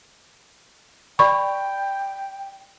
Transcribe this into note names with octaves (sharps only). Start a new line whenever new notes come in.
D5 G5 B5 C#6